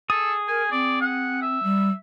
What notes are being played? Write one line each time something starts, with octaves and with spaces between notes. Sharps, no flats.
G#4 A4 D#6
A#4 G#5
C4 D5
F#5
E5
G3